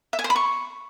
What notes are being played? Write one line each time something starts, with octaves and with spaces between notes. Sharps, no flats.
E5
G#5
C5
B5
C#6